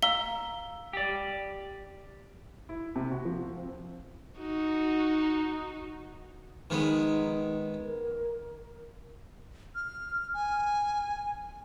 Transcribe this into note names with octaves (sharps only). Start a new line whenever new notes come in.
F5 A#5 E6 G7
G4 D5
E4
C3
F#4
F3
C4
D#4 F#4
D#3 G#3 B3 D#4
A#4
F6
G#5